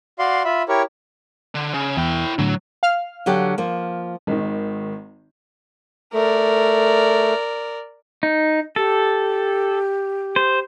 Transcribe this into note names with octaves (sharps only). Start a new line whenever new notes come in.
F#4 D5 F5 C6
F4 E5 B5
E4 G4 A#4 C#5
D3
C#3
E2 E4 G5
A2 D3 F#3
F5 F6
D3 F#3 G4
F3 A#3
G#1 D#3
A3 A#4 D5
D#4
G4 A4
C5